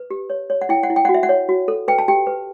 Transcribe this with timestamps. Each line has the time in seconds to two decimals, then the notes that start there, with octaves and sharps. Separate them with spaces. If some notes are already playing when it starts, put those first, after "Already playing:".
Already playing: B4
0.10 G4
0.30 C#5
0.50 C#5
0.61 F#5
0.69 E4 G5
0.83 F#5
0.90 E4
0.96 G5
1.05 F#5
1.09 F#4
1.14 E5
1.23 F#5
1.29 C#5
1.49 F#4
1.68 A4
1.88 B4 G5
1.98 A5
2.08 G4 G5
2.27 B4